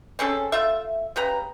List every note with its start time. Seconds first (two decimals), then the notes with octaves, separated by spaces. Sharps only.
0.19 C4 C#4 G#4 A4
0.52 A3 F4 E5
1.16 C#3 G4 B4 A#5